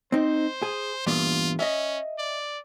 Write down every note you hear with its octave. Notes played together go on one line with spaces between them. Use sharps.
C4 D#4 C5
G#4
E2 G2 A#2 F4
C#4 D#5 E5
D5